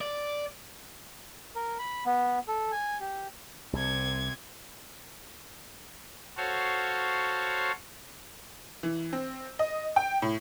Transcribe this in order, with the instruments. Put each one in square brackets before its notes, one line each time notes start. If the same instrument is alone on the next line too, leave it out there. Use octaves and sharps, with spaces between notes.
[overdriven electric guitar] D5
[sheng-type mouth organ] A#4
B5
B3
A4
G#5
G4
[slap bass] C2 [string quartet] C3 G#6
[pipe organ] F#4 A4 C5 C#5 F5
[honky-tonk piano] E3
C4
D#5
G5
A2